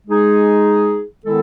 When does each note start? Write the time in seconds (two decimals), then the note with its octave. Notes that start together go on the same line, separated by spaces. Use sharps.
0.08 G#3 D#4 G#4
1.25 D#3 G#3 B3 E4 A4